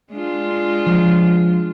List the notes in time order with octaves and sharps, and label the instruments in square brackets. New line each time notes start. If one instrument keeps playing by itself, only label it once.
[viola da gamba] G#3 D4 F4
[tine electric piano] F3